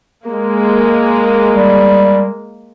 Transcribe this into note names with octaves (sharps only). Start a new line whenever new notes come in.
G#3 A#3
G3